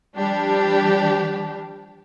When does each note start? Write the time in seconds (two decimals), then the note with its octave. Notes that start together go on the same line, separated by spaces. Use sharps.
0.17 F3 G3 D4 G4